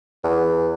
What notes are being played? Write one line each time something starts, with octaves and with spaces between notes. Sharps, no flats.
E2